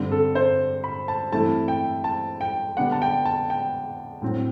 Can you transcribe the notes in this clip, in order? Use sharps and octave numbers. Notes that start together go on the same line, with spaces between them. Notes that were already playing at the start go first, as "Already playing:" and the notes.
Already playing: G2 D3 G3 C4
A4
C5
B5
A5
G2 E3 A3 C4 E4 A5
G5
A5
G5
D3 G3 B3 D4 F#5
A5
G5
A5
G5
A2 F#3 C4